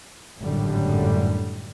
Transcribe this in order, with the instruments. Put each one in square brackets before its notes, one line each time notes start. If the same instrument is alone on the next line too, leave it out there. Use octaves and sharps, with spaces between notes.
[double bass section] G#1 F#2 A2 D3 G3